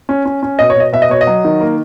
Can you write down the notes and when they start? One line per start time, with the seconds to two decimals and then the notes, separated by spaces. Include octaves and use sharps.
0.09 C#4
0.26 C#4
0.43 C#4
0.59 B2 D#5
0.70 C#5
0.76 B2 D#5
0.93 B2 E5
1.02 D#5
1.10 B2 C#5
1.21 D#5
1.27 F#3
1.45 D#3
1.61 A#3